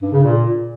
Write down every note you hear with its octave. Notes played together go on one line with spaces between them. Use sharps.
G2
C#3
A#2